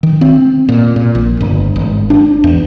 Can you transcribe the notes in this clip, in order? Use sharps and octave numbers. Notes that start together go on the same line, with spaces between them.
D#3
C4
A#2
A#2
A#1
G1
G#1
D4
E2